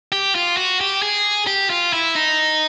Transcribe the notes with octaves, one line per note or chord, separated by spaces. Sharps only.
G4
F4
F#4
G4
G#4
G4
F4
E4
D#4